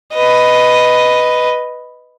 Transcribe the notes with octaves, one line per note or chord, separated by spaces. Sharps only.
B4 D#5